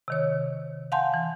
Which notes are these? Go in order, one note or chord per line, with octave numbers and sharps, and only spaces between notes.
C3 D#3 C#5
F5 F#5 G#5 A5 C6 G6
E3